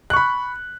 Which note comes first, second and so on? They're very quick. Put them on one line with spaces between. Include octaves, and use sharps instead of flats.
F#6 C#6 B5